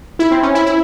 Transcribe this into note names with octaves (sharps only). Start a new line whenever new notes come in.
E4
C4
C#4
E4
E4